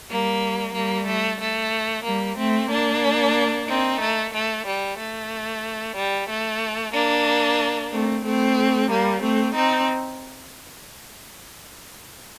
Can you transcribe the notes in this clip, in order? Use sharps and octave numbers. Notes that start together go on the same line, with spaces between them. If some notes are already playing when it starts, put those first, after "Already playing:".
G3 A#3
G3 A#3
A3
A3
G3 A#3
A3 C4
A#3 D4
C4 D#4
A3
A3
G3
A3
G3
A3
A#3 D4
A3 C4
A3 C4
G3 A#3
A3 C4
C4 D#4